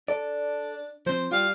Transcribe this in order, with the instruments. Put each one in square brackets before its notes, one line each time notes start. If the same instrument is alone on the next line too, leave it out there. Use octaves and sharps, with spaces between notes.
[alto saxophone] D4 [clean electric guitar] A4 D5
[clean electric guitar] F3 C4 [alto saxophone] C5
[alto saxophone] G3 [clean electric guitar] F4 G4 [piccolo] F5